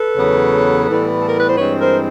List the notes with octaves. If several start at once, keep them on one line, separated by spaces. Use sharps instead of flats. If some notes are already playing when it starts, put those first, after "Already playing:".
Already playing: A4 B4
E2 C#3 F#3 B3
A2 E3 G3 B3
A4
A#4
B4
C5
G2 E3 G#3 C4 B4 C#5
A#4 C5